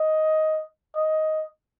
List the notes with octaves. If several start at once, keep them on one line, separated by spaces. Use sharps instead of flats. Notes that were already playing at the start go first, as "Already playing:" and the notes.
Already playing: D#5
D#5